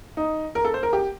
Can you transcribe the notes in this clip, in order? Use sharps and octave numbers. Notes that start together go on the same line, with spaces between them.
D#4
A#4
A4
C5
A#4
G4